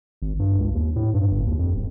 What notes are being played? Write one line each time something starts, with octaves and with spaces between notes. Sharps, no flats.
G#1
G2
C#2
D#2
A2
G2
G1
D#2
F2
D1